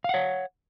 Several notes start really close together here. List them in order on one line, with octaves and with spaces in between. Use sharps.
F5 F#5 C#5